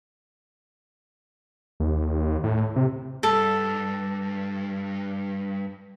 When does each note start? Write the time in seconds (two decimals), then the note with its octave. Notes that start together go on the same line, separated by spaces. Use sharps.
1.80 D#2
2.44 A2
2.76 C3
3.23 G2 A4